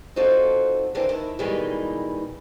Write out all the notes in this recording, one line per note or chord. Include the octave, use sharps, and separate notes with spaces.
C4 D#4 F4 F#4 A4 D5
E3 A#3 C4 D4
D#3 E4
B2 D#3 E3 G3 G#3 D#4